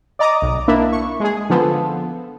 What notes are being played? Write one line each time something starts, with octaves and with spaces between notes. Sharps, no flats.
D5 D#5 A#5 D6 D#6
B1
A#3 D4 E4
C#6
G#3 G#4
D3 F3 B3 A4